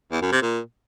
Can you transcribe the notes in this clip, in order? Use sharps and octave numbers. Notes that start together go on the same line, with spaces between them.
E2
F#2
C3
A#2